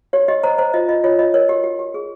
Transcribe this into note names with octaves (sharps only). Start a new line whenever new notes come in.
G4 C#5
G4 D#5
C5 A#5
C5 A#5
F4 D#5
F4 D#5
F4 C#5
F4 D#5
A#4 C#5
G4
G4
G4
G#4